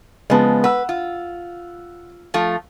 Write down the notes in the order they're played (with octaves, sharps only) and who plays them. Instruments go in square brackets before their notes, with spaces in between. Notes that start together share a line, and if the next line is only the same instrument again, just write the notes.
[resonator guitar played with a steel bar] C#3 F3 [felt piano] G#3 B3 A5
[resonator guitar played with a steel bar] B4 [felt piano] F#5 E6
[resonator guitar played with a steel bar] F4
F3 A3 F4